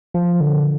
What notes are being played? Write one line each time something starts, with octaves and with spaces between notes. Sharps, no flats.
F3
D3